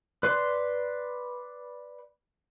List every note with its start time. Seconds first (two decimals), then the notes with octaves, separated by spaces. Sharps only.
0.23 B4 D5 C6